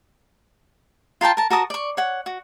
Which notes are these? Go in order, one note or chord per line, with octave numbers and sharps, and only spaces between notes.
F4 A#4 G5 A5
A#4 A5
F#4 A#4 A5 D#6
D5 C#6
C#5 F#5
F#4